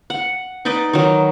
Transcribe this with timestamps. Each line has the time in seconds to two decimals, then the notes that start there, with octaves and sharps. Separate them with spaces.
0.10 F#5
0.65 D#4 B4 D5 D#5
0.93 D#3 F#3